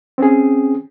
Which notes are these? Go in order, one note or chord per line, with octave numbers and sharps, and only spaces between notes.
C4 C#4 G#4